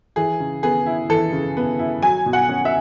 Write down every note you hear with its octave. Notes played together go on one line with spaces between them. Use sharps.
E3 G#4
C#3
B3 G#4
E4
E3 A4
C#3
B3
E4
F#3 G#5
B2
F#5
C#4
E5